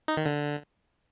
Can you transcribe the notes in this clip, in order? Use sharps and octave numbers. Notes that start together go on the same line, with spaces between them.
D#4
D#3
D3